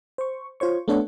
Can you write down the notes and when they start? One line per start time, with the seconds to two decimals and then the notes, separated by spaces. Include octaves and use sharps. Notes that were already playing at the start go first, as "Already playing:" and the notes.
0.18 C5 C#6
0.60 F4 C5 C#5 C#6
0.88 A3 B3 D4 A4 C#5 F#5